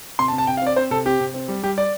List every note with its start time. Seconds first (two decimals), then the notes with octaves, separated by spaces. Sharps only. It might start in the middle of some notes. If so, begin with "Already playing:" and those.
0.19 C3 C6
0.28 A5
0.33 C3
0.38 A5
0.47 C3 G5
0.57 F5
0.62 C4 D5
0.76 C4 C5
0.91 C3 A4
1.06 C4 G4
1.20 C3
1.34 C4
1.48 G3
1.63 G3 G4
1.78 D5